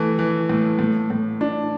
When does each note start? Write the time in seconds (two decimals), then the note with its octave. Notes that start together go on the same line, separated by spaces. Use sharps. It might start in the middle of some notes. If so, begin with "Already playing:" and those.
Already playing: E3 A3
0.19 E3
0.49 A2
0.79 A2
1.10 A2
1.41 D4